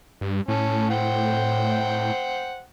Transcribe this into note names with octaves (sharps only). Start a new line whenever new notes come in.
G2
A2 C#4 A5
C5 F#5 G5